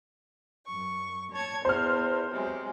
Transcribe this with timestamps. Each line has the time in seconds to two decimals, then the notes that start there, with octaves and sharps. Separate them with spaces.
0.66 F#2 C#6
1.32 C#5 A5 G#6
1.65 E2 B3 C5 F6
2.30 C3 F#3 G#3